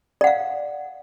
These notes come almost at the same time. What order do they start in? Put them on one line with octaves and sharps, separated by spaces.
D5 F#5 F5